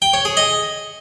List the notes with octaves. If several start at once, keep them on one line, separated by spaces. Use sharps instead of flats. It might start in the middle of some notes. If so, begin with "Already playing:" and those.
G5
C#5
G#4
D#5